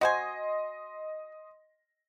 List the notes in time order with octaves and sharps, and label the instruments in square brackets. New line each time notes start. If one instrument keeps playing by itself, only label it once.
[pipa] F#4 C5 G#5 [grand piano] D#5 C6